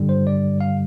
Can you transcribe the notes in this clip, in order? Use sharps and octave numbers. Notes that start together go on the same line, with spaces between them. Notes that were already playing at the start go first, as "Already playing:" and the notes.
Already playing: G2 D3 G3
C5
D5
F5